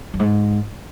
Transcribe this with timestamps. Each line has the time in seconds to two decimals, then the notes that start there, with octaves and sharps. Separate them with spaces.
0.14 F#2
0.19 G#2